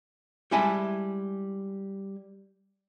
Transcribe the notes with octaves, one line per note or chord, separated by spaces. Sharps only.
G3 G#3 E4 E5 G#5 A5